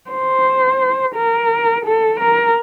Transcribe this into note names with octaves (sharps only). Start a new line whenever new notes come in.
C5
A#4
A4
A#4